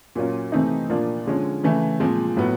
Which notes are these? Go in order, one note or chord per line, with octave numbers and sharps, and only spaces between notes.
A#2 F#3 A#3 C#4 F4
C3 E3 A3 C4 D#4
A#2 F3 A#3 D4 F4
D3 F3 G#3 C#4
C#3 E3 A3
A#2 F3 G#3 C4
A2 F#3 B3